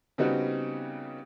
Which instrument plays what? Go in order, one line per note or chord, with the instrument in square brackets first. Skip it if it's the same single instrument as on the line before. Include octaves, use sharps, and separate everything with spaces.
[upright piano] C#3 G3 B3 C4 D#4 F#4